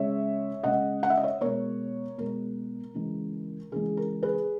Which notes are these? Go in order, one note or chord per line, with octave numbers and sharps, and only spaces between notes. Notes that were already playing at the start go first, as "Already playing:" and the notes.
Already playing: C#3 G#3 C#5 E5
C#3 G#3 D#5 F#5
F#5
E5
D#5
C#5 E5
B2 G#3 A#4 C#5
B2 G#3 A#4
C#3 E3 G#3
C#3 E3 G#3 G#4
A#4
G#4 B4